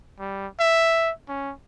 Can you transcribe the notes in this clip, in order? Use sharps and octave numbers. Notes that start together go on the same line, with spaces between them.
G3
E5
C#4